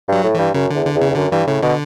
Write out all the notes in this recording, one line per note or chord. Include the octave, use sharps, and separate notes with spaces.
G2 F#3
A2
G2 E3
F#2 C#3
E2 D3
D3
E2
C#3
E2
F#2 D3
G2 E3
A2 C#3
B2 D3